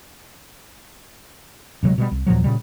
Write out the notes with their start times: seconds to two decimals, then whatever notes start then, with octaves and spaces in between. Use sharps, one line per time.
1.83 D#1 C3 F#3 G#3
1.98 B2 E3 G3
2.11 C2
2.26 D#2 A#2 F3 F#3
2.44 A#2 C#3 G3